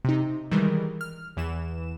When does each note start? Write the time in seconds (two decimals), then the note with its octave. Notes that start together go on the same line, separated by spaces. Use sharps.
0.05 C3 D#4
0.51 D#3 E3 G3 G#3 A#4
1.01 F6
1.37 E2 E3 E7